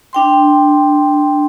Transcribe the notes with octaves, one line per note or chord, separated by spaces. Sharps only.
D4 G5 C6